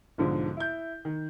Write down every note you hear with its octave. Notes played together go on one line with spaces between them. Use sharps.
B1 G#2 D3 F3
E4 G6
D#3